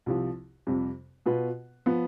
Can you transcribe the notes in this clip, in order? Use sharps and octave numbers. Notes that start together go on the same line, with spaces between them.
C2 C3 F3
F2 C3 G3
B2 B3 F4 B4
F3 B3